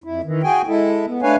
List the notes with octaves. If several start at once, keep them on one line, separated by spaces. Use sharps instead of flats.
F2 E4
D#3 E3
F#4 G#4 G5 G#5
G#3 E4 A4
B3
A3 D4 B4 C#5 F5 G#5